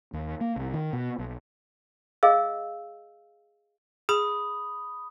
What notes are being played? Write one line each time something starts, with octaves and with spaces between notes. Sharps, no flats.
D#2
A#3
C2
D#3
B2
B1
G#4 D#5 F5 E6
G#4 B5 D#6